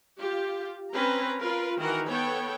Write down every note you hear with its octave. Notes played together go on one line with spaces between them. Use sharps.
F4 G4
C4 C#4 B4 A#5
F4 A#4 B4
D#3 E3 F#4 A#4 F#5
B3 A4 C#5 G5